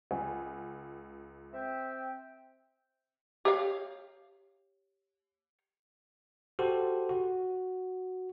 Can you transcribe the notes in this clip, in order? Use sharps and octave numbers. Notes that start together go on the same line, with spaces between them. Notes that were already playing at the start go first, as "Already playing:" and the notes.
C#2 F#5 G#5
C4 E5 G5
G4 C#5 F5
F#4 G4 A4 C5
F#4